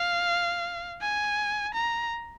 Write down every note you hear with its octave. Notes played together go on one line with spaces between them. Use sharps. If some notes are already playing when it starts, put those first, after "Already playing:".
Already playing: F5
G#5
A#5